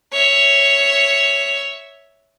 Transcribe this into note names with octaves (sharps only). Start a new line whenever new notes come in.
C#5 E5